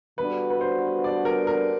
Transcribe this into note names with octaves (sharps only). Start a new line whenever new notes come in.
D3 G3 B3 D4 F#4 B4
B4
C5
D5
A#4
A#4